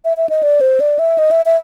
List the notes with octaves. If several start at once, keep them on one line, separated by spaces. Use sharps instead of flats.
E5
E5
D#5
D5
C5
D5
E5
D#5
E5
E5